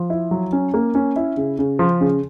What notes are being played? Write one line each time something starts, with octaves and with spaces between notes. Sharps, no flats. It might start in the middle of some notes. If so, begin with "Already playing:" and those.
Already playing: F3
E4
F#3
C#4
A#3
C#4
E4
C#3
C#3
F3
C#3